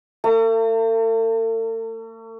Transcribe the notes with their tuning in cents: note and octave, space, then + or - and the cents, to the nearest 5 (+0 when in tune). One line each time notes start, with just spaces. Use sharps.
A3 +45 A#5 -45